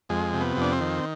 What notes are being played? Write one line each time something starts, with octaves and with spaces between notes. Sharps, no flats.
F2 G#3
C3
B3
F2 D4
C4
D#3